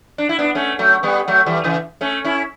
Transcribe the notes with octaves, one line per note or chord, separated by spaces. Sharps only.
D4
E4
B3 D4
A3 C#4
F#3 A3
G3 B3
F#3 A3
E3 G3
C#3 E3
A3 C#4
C#4 E4